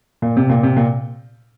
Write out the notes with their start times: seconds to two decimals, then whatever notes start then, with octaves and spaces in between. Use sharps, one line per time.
0.22 A#2
0.37 C3
0.50 A#2
0.63 C3
0.76 A#2